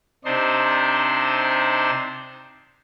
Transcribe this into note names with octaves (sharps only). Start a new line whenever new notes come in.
C3 D4 D#4 C5 C6